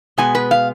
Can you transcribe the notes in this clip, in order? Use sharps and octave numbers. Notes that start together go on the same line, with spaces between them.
B2 G#3 B3 G#5
B4
F5